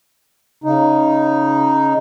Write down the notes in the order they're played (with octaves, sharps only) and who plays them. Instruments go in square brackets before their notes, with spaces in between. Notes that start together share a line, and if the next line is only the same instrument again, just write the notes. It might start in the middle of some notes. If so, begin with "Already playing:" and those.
[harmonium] C#3 D#4